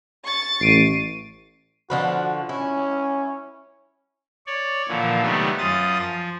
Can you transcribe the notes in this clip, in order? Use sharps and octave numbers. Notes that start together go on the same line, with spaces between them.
C#6 A6
A1 C7 D7 D#7
D3 F3 F#4 B4
C#4 E4
C#5 D5
A#2 D3 E3 F3
C3 D#3 F#3 G3 A3 B3
F#2 F4 D#6 A6
F3